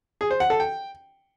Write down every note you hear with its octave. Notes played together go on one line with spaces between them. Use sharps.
G#4
C5
F#5
A4
G5